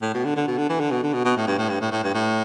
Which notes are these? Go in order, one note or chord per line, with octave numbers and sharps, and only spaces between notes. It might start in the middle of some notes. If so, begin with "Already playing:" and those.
A2
B2
D3
D3
B2
D3
E3
D3
B2
D3
B2
B2
A2
G2
A2
G2
A2
A2
G2
A2